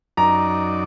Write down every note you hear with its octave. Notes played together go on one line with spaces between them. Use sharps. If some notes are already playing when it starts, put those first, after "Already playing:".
F#2 D#4 D5 A#5